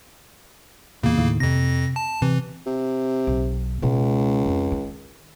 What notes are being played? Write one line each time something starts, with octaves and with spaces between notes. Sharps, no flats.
E2 A#2 C#3 A#3
D#2 A2
F2 C3 A#6
A5
C3 E3
C3
B1
C#2 B2 G#3
F2
D#3